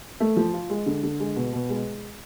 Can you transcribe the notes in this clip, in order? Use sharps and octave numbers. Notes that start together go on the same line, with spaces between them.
A3
F3
F4
G#3
D3
D3
G#3
B2
B2
G#3